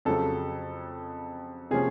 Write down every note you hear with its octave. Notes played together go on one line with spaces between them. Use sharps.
F2 C#3 F#3 A4
C3 F3 A#3 C#4 G#4